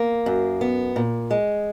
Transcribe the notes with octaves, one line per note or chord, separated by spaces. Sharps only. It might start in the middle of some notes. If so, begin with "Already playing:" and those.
Already playing: A#3
F#2
B3
A#2
G#3